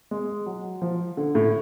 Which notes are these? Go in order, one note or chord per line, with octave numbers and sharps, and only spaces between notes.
G#3
F#3
F3
D3
A2